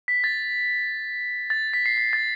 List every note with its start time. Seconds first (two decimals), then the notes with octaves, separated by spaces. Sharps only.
0.08 B6
0.24 A6
1.50 A6
1.73 B6
1.86 C7
1.97 B6
2.13 A6